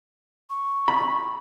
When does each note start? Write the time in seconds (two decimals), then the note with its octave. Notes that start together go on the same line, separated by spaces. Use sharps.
0.50 C#6
0.88 B5